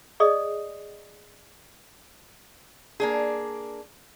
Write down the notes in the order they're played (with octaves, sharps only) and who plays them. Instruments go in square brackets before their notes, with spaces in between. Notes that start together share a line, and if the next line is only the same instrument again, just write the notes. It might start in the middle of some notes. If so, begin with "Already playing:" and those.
[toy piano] G#4 D5 D#5 D#6
[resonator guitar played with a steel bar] A#3 D4 G#4